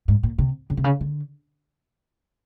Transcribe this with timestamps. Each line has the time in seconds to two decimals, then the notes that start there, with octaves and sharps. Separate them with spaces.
0.08 G#2
0.23 A#2
0.38 C3
0.70 C#3
0.77 C3
0.84 C#3
1.01 D3